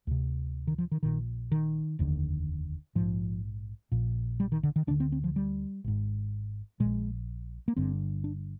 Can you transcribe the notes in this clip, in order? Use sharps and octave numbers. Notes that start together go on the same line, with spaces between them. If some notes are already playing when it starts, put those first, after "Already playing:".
D2 C3
D#3
F3
D#3
A#1 A#2 D#3
D#3
F1 D#2 D3
A#1 G#2 F3
A#1 A#2
G3
D#3
D3
D#3
D2 D3 D4
C4
C4
F3
G3
G#1 G#2
A#1 A#2 G#3
A#3
G1 G2 D3 C4
D4